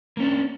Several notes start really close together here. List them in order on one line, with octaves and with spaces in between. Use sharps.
A#3 C#4 D4